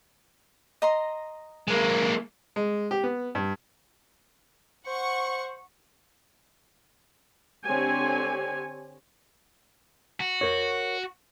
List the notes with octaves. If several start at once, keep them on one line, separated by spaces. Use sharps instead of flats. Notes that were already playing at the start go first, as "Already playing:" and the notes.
D#5 A#5 C6
G#3 A#3
G#3
G4
B3
G2
C5 F#5 C#6
D3 C4 G4 C#5 G#5
F#4
A#4 C#5